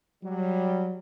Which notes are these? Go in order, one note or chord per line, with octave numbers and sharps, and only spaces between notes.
F#3 G3